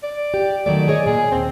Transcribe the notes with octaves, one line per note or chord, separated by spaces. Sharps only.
D5
G4
D#3 F#3 A3 D5
G#4 C#5 D#5
A#2 G#4
D#2 C4